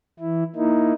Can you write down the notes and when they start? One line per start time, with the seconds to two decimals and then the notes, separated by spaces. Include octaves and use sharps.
0.19 E3 E4
0.56 A#3 D#4 E4